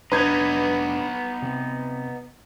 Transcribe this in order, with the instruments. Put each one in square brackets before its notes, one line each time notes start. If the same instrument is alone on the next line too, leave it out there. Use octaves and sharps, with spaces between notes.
[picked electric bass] F1 D4 [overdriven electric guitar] B3 D#4 [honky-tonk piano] B4 G#6
[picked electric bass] C3